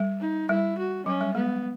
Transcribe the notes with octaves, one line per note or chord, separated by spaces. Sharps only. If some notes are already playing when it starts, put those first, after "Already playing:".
Already playing: G3
D#4
G3 E4
F#4
F#3 C#4
G3
G#3 B3